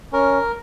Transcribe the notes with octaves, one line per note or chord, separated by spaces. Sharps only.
C#4 A#4